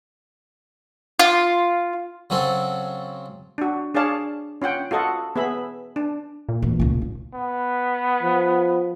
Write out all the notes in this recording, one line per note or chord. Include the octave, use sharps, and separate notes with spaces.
F4
C#3 F#3 C4 A4
D4 F#4
D4 G#4 C#5 D5 F5 A5
C#4 F4 F#5 G5
F4 F#4 A4 D#5 F#5
B3 G#4 E5 B5
D4
A#2
D1 E3
C#2 C#4
D#2
B3
F3